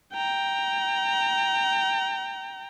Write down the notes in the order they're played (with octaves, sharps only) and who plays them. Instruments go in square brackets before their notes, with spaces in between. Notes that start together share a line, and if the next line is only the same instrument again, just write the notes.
[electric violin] G5 A#5